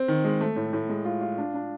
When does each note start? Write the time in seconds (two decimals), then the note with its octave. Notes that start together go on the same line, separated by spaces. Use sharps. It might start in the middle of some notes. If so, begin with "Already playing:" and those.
Already playing: C4
0.08 D#3
0.24 G#3
0.41 A3
0.56 A2
0.73 A2
0.89 G#3
1.05 F4
1.21 F4
1.38 D4
1.54 D4